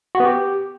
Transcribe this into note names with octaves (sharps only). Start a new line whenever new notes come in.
F#4
B3
G4